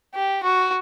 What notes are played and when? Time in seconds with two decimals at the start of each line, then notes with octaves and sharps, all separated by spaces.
0.15 G4
0.43 F#4